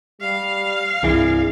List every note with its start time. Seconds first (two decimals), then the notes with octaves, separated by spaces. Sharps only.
0.21 G3 F5
1.03 C2 G2 E3 G#4